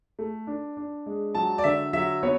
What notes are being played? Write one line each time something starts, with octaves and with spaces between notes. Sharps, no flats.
A3
D4
D4
G#3
F#3 A5
D5
D3 E5
F#3 E5
B3 C#5